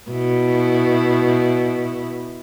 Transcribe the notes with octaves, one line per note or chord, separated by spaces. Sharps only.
B2 E4